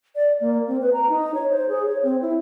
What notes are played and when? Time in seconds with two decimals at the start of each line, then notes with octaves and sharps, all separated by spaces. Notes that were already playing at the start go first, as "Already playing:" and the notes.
0.16 D5
0.41 A#3
0.67 C4
0.81 B4
0.93 A#5
1.09 D#4
1.34 C#5
1.51 C5
1.68 G#4
1.86 C#5
2.03 C4
2.22 E4